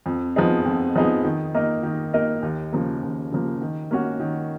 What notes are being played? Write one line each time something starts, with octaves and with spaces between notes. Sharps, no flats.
F2
F3 B3 D#4 G#4
F2
F3 B3 D#4 G#4
D#3
A#3 D#4 A#4 D#5
D#3
A#3 D#4 A#4 D#5
D#2
C#3 F3 A#3
D#2
C#3 F3 A#3
D#3
A#3 C#4 F#4
D#3